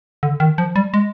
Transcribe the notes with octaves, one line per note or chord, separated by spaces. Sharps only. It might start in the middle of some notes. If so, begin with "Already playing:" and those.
D3
D#3
F3
G3
G#3